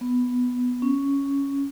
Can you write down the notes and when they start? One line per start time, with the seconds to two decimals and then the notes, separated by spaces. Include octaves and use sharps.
0.01 B3
0.82 C#4